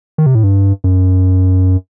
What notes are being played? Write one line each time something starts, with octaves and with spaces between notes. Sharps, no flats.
D#3
C3
A2
G2
F#2